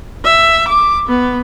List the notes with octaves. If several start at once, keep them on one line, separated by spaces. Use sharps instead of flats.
E5
D6
B3